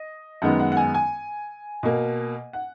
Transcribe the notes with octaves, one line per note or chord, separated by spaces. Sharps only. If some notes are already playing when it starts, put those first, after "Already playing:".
Already playing: D#5
F#2 D#3 G#3 B3 F#5
F#5
F#5
G#5
G#5
B2 A#3
F#5